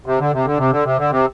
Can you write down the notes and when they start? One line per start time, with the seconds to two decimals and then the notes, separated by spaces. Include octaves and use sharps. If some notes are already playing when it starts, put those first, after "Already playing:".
0.06 C3
0.19 D3
0.33 C3
0.45 D3
0.58 C3
0.71 D3
0.84 C3
0.98 D3
1.10 C3